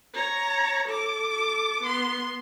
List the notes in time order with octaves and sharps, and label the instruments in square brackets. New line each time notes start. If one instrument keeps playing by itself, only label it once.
[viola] C#5 A#5
A4 D6
B3 C6